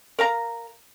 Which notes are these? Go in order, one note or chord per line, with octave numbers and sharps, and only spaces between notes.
A#4 F5 A#5